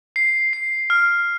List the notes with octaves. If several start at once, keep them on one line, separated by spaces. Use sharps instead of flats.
C7
C7
F6